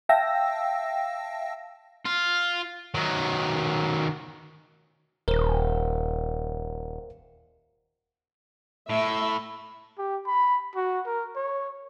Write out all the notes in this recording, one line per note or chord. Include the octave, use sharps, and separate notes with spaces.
E5 F5 G5 A5 E6 A#6
F4
D#3 F#3
D#1 A#4 C5
A2 E5
G4
B5
F#4
A#4
C#5